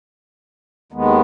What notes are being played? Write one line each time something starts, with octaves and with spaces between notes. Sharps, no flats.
D#2 D#3 G#3 B3